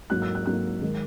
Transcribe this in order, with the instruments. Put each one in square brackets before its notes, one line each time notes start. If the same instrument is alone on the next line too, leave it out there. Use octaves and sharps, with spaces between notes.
[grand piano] G#2 F#3 A#3 F#6
E6
F#6
G#2 F#3 A#3 F#6
D#3 G#3